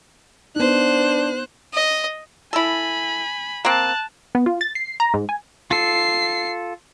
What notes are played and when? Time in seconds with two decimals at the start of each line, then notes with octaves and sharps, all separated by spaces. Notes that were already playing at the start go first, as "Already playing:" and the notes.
0.56 B3 D4 D#4 C5 F#6
1.74 D#5
2.53 E4 A4 G#5 B5
3.65 A#3 C4 A5 F#6
4.35 B3
4.46 F4
4.61 A6
4.75 C7
5.00 A#5
5.14 G#2
5.29 G#5
5.71 F4 A4 C7